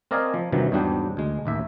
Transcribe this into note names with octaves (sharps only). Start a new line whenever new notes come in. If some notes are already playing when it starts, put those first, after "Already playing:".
C4 A#4 D5 D#5 F5 G#5
F3
G2 C3 D#3 E3 F#3
E2 G#2 F#3 G3 D4 G5
D2 G#3
A1 D#2 E5